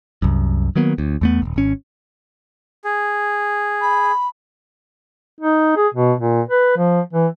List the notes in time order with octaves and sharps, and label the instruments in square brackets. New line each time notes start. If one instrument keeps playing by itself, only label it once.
[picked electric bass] C2 F#2
D#3 F#3 A#3 B3
D2
E2 A3 B3
D#1 D#2
G#1 C#4
[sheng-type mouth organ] G#4
[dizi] B5
[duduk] D#4
G#4
B2
A#2
B4
F3
E3